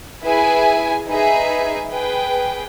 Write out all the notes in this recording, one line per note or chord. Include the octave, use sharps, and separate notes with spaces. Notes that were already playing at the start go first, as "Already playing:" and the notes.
E4 G#4 B4 E5 G#5
D#4 G#4 B4 E5 G#5
G#4 B4 G5